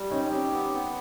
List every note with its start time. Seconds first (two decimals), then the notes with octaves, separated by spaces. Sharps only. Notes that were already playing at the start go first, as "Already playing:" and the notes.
Already playing: G3
0.11 C4 C#4 D#4
0.31 C#4 D#4 G4
0.52 B3
0.73 B3